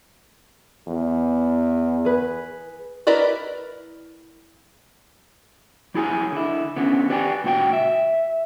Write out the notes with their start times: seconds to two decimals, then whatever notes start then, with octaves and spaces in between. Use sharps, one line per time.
0.87 E2
2.05 G#4 B4
3.07 E4 A#4 B4 D5 D#5
5.95 F#3 E4 G#4 G#5
6.32 D3 E4
6.76 D3 B3 C#4
7.10 G4 B4 D5 G5 G#5
7.44 C#2 A#2 F#4 G4 G5
7.73 E5